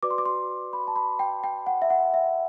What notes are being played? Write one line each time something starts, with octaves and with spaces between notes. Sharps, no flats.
F#4 B4 D5 D6
C6
D6
C6
B5
A5
B5
G5
G5
F#5
E5
F#5
E5